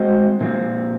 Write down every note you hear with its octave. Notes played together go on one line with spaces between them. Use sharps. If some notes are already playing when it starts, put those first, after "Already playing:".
Already playing: G#3 C4 F#4 C5 D#5
A#2 F3 C4